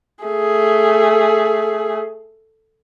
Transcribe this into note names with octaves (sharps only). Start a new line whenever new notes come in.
A3 G#4